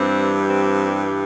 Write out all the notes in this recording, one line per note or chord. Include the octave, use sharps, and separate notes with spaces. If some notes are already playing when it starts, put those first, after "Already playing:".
Already playing: G2 E3 G3 C4
C4